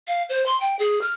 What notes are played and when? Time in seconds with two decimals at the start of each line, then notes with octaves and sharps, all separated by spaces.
0.07 F5
0.29 C5
0.46 C6
0.60 G5
0.79 G#4
1.02 F6